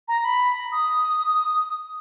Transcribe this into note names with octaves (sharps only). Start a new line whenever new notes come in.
A#5
B5
D#6